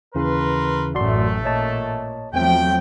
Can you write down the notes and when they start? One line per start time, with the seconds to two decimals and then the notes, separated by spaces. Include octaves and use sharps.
0.15 D#2 C#3 E3 A#4 B4 C6
0.95 A1 F#2 A3 F#4 D5 C6
1.45 A#2 C#5 D#5 A5
2.34 E2 F3 F#3 A3 C4 G5